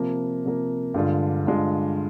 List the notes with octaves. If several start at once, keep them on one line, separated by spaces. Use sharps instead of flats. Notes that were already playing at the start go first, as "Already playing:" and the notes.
Already playing: C3 F3 A#3
C3 F3 A#3
G2 D3 G#3 D4 F4
G2 D3 G#3 D4 F4